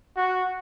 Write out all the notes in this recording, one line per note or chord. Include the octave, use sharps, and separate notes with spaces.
F#4